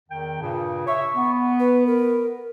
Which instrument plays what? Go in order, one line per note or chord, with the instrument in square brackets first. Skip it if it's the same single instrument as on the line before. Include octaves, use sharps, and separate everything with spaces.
[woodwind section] E2 D#3 G5
G2 A#2 C#3
[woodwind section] C#5 E5 [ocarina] C#6
[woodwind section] B3
[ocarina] B4
A#4